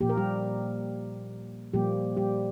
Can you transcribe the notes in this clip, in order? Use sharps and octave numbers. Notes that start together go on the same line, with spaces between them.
A#2 F3 A#3 G4
A#4
G3 G4
A#2 F3 G3 A#3 G4
G3 G4